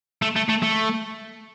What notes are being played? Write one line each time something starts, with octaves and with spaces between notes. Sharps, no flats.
A3
A3
A3
A3